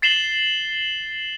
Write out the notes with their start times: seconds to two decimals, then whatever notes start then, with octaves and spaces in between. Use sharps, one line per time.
0.02 A6 C7 E7 F#7 G7